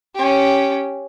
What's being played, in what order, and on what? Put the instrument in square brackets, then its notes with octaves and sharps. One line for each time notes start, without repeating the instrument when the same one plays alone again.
[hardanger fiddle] C#4 G4